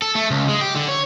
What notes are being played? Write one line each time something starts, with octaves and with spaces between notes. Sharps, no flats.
A4
A3
C#2
G#3
G4
D3
C#5